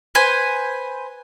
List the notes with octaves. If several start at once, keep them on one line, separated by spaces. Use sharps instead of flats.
B4 C5 G#5